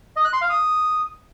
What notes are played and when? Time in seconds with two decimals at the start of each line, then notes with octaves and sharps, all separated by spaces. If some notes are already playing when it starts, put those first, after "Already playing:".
0.16 D#5
0.25 F#6
0.33 C6
0.41 F5
0.50 D#6